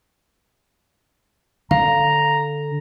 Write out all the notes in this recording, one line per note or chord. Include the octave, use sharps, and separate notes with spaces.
D3 F5 A#5